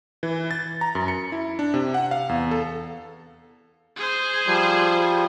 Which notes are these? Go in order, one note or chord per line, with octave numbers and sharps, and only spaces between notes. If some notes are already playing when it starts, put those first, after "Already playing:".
E3
A6
A#5
F#2
C#7
E4
D4
C3
F#5
F5
E2
A4
G#4 C5
F3 G3